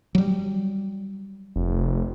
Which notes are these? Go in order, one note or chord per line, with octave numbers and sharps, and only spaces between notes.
F#3 G3
F1